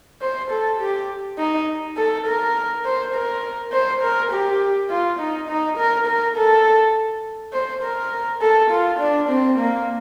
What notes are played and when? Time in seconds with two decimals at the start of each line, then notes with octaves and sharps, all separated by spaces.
0.22 C5
0.51 A4
0.80 G4
1.39 D#4
1.97 A4
2.27 A#4
2.85 C5
3.14 A#4
3.73 C5
4.02 A#4
4.32 G4
4.90 F4
5.19 D#4
5.49 D#4
5.77 A#4
6.07 A#4
6.37 A4
7.53 C5
7.83 A#4
8.41 A4
8.71 F4
9.00 D4
9.29 C4
9.59 A#3